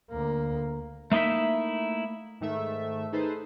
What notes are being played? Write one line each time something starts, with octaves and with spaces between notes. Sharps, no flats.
D2 A#3
A3 A#3 D#4 E4 E5
G#2 D#3 A3 E5
D#4 G#4 A4 B4 C5